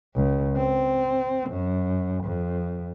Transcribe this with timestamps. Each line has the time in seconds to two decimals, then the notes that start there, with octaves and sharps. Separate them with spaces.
0.15 C#2
0.57 C4
1.50 F#2
2.24 F2